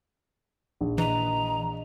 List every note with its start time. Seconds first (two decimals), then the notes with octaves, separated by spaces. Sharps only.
0.81 A#1
0.98 E3 B4 D#5 A#5